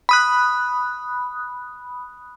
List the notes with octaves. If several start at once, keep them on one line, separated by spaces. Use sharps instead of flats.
B5 D#6 F#6